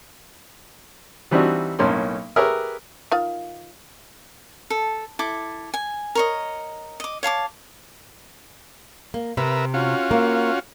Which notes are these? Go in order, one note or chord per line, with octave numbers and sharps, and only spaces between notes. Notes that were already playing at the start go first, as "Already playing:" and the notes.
E3 G3 C4 D4 D#4 F#4
B1 A2 A#3 C#4 C6
G4 G#4 A#4 B4 C#5 E5
D#3 F4 F5
A4
E4 A4 D6
G#5
A#4 C#5 D#5
D#5 D6
C#5 F5 A5 D6
A#3
C3 A#4 B4 E5
C#4 F4 F#4
A#3